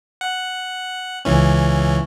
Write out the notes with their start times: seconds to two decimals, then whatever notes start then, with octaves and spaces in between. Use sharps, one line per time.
0.21 F#5
1.25 C#2 E3 C#4